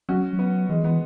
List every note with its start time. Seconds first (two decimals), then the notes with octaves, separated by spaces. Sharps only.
0.09 F#3 C#4 F#4
0.33 F#3
0.39 B3
0.69 E3 G#3
0.84 E3 B3